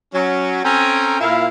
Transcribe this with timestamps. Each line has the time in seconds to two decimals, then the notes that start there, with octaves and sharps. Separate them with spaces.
0.14 F#3 C#4
0.64 C4 C#4 A4 G5 G#5 A#5
1.20 A#2 E4 F5